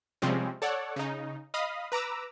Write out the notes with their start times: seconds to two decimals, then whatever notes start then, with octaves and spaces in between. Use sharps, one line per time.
0.22 C3 F3 G3 G#3 C4 C#4
0.62 A4 C#5 D5 F#5
0.96 C#3 D#4
1.54 D#5 F5 B5 D#6
1.92 B4 A#5 D6 E6